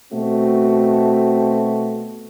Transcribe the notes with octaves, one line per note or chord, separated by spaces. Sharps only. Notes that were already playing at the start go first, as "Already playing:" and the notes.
B2 A3 C4 F#4